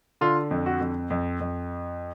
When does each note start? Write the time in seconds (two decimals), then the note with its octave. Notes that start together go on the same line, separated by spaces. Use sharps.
0.21 D3 F4
0.51 F2
0.66 F#4
0.80 F2
1.10 F2
1.40 F2